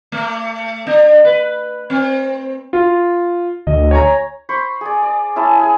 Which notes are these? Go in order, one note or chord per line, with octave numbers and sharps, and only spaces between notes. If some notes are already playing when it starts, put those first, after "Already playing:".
A3
D4
B4
C4
F4
D2 D#5
C#5 G#5 A#5
C5 B5 C#6
G#4 D5
D5
C#4 E4 G#4 A5
G#4 G#5